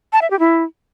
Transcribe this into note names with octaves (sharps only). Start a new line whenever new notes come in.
A5
E5
G4
E4